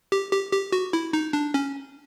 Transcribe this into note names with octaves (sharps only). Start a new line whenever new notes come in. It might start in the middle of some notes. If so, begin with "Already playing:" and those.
G4
G4
G4
F#4
E4
D#4
D4
C#4